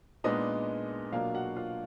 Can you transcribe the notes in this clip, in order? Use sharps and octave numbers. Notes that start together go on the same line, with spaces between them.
A#2 G#3 B3 D4 D#4 D#5
B2 F#3 A#3 D4 F4 F5
F#4 F#5
F4 F5